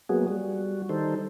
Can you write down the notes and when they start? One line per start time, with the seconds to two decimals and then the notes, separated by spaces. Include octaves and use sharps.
0.09 F#3 G#3 A#3 B3 F#4 G#4
0.28 G3 F#4
0.89 D#3 G3 D#4 A4 C5